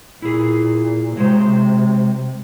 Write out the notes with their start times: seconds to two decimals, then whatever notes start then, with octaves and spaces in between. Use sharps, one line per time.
0.22 A#2 E4 G#4
1.17 C3 F#3 G#3 C5